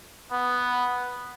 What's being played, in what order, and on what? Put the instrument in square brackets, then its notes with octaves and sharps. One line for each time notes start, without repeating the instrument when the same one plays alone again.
[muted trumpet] B3